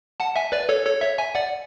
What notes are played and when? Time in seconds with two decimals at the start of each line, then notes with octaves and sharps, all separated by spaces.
0.20 F#5 A5
0.36 E5 G#5
0.52 B4 D5
0.69 A4 C#5
0.86 A4 C#5
1.01 C#5 E5
1.18 E5 G#5
1.35 D5 F#5